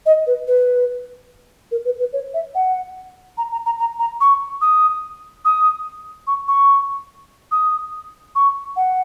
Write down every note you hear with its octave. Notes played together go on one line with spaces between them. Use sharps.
D#5
B4
B4
A#4
B4
B4
C#5
E5
F#5
A#5
A#5
A#5
A#5
A#5
C#6
D#6
D#6
C#6
C#6
D#6
C#6
F#5